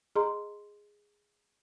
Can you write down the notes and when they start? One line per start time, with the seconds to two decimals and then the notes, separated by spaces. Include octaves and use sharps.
0.16 G#4 D#5 A#5 C6